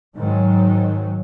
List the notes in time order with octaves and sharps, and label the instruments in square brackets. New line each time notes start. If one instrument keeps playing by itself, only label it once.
[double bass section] G#2 D#3 F#3